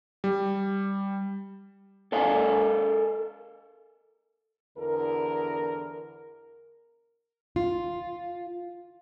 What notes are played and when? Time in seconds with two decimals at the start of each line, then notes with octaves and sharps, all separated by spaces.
0.24 G3
2.12 A4 A#4 D#5 F5 G#5
4.78 E2 D3 A#4
7.56 F4